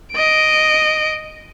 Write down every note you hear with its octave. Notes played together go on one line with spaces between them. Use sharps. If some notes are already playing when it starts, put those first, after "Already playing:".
D#5 D7